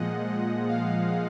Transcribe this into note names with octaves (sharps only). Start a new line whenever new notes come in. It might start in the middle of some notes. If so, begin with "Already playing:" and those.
Already playing: A#2 F3 G#3 D#5 F#5
D#5
F5